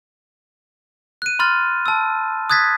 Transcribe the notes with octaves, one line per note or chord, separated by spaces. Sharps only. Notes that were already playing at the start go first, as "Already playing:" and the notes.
F#6 D#7
B5 C6 F6 A6
A5 E6
D#6 F#6 G#6 A6 B6